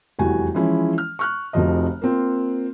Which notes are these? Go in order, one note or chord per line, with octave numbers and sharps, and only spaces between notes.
F1 E2 G3 F#4 G#5
E3 F3 G#3 C#4 E4
F6
C#6 F6 F#6
F1 F2 C3 F3 F#4 D#5
A#3 C4 F4